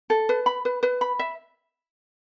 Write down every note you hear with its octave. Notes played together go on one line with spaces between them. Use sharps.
A4
B4
B5
B4
B4
B5
E5